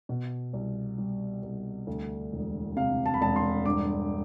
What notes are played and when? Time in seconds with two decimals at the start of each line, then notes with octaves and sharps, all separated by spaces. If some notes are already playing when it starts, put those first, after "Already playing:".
0.09 B2
0.53 C2
0.98 G3
1.43 C2
1.87 D2
2.32 E1
2.76 C3 F5
3.06 A5
3.14 B5
3.21 E1 A5
3.36 C6
3.66 G2 D6